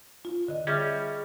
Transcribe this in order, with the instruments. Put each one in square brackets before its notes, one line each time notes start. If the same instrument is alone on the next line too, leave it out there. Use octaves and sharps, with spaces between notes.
[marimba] F4
D3 D#5
[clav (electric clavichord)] G3 C#4 [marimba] G#4 E5